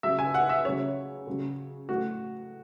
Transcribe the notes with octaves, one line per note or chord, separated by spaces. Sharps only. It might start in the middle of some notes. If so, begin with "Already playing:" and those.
C#3 F#3 E5
G#5
F#5
E5
C#3 F#3 C#5
C#3 F#3
A2 F#3 F#4